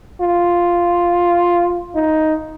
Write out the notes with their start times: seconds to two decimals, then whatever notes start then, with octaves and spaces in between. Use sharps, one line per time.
0.21 F4
1.95 D#4